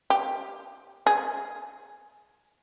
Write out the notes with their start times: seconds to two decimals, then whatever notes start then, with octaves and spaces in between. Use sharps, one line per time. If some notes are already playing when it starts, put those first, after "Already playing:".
0.10 G4
1.07 G#4